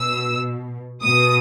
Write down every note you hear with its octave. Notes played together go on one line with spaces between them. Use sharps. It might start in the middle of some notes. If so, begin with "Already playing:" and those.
Already playing: B2 E6
B2 D#6